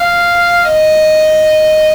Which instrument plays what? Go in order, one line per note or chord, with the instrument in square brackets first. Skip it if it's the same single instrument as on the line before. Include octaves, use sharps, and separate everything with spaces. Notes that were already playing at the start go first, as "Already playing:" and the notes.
Already playing: [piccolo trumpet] F5
D#5